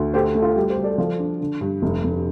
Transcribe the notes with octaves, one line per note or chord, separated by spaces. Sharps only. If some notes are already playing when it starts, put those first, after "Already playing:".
Already playing: D2
A3 G4 C5
A3
F4
G3 G4
G4 C5
G3
A4 D5
F3 F4 A4
D4
D3
G2
F1
F1